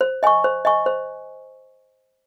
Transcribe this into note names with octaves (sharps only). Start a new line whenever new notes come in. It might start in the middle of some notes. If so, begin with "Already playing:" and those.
C5
D#5 G#5 C#6
C5
D#5 G#5 C#6
C5